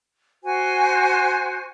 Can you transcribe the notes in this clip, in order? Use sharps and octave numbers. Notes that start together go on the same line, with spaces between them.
F#4 C5 G#5